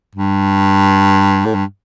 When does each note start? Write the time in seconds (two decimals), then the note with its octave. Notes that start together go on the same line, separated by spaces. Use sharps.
0.16 G2
1.46 A2
1.55 G2